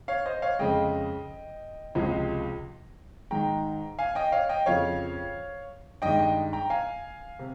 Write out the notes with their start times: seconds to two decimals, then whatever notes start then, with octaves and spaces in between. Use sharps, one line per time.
0.08 C#5 F5
0.26 C5 D#5
0.42 C#5 F5
0.59 F2 C#3 G#3 D#5 G5
1.95 C#2 C3 F3 G#3
3.31 G#2 D#3 G#3 G5 A#5
3.99 F5 G#5
4.15 D#5 G5
4.32 C#5 F5
4.49 D#5 G5
4.66 F2 C#3 F3 C#5 F5
6.02 G2 D#3 G#3 D#5 G5
6.19 D#5 G5
6.53 G5 A#5
6.70 F5 G#5
7.39 C3